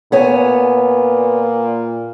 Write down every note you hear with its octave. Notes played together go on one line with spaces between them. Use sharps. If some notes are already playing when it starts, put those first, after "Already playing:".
A#2 B3 C#5 G#5